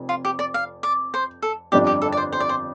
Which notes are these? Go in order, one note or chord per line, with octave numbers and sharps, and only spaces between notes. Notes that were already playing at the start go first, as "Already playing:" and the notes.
Already playing: F1 F2
F4
G4
D5
F5
D5
C5
A4
G1 F2 D3 G3 D4 G4
G4
A4
D5
C5
C5
D5
C5